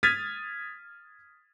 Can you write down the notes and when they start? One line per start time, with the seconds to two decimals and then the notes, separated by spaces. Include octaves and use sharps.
0.03 D#6 F6 G#6 A6 B6 D#7